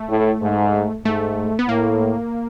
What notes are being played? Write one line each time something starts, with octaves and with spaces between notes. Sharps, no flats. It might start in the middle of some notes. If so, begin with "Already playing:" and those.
Already playing: A3
A2
G#2
G#2 A3
B3
A2 A#3